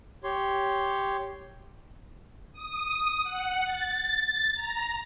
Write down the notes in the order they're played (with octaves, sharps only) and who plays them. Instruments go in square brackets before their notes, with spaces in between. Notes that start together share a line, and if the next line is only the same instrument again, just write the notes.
[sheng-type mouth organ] G4 C#5 C6
[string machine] D#6
F#5
A6
A#5